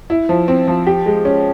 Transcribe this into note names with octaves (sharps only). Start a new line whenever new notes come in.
E4
F3
C4
F3
G4
G#3
C#4